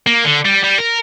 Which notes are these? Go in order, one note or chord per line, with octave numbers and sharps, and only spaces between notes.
A#3
D3
G3
G3
A#4